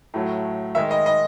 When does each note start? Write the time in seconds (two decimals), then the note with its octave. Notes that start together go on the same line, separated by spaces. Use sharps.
0.14 A2 F#3 A3
0.75 D#3 G#3 E5
0.91 D#5
1.06 D#5